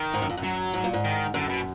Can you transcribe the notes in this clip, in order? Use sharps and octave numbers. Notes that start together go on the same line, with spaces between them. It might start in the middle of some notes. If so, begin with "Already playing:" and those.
Already playing: D#3
G#2
F#2
F2
F#2
F#3
G#2
A#2
G#2
D#3
F#2 D3
B2